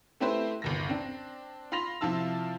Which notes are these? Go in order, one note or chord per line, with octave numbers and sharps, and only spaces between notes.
A3 C4 E4 G4 B4 C5
G1 D#2 A#6
C4 D4
F4 B5 C6 A#6 F7
C3 F3 E4 F4 A5 E6